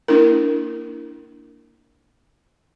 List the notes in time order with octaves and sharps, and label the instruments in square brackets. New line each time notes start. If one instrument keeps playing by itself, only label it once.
[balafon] A#3 D4 E4 A#4